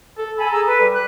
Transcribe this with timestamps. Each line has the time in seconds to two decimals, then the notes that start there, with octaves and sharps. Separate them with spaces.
0.18 A4
0.37 A4 G#5 B5
0.51 G#4 A#5 E6
0.66 B4
0.81 G3
0.92 F#6